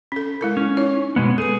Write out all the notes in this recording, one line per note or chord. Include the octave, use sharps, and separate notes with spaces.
C#4 A4
G#3 E4 A#4
C#4
D#4 E4 C#5
B2 G#3 B3
G#4 A4 B4